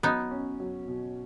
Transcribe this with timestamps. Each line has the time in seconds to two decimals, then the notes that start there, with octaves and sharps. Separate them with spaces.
0.03 F#3 B3 D#4
0.31 C#4
0.60 F#3
0.88 B2